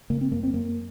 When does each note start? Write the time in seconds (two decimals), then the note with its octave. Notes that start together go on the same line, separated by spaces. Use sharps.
0.10 C#3 A#3
0.21 C4
0.32 F#2 A#3
0.43 C4
0.54 F#2 A#3